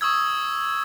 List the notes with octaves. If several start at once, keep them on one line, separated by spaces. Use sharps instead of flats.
C#6 D#6 E6 G#6